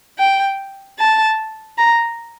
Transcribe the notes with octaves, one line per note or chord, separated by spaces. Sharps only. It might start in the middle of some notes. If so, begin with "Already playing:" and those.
G5
A5
A#5